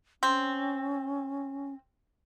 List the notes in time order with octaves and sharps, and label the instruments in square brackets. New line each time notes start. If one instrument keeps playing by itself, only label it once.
[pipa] C4 [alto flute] C#4